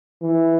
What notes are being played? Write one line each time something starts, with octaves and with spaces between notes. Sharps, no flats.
E3